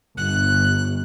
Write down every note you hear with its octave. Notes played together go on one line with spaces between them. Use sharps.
G1 F#6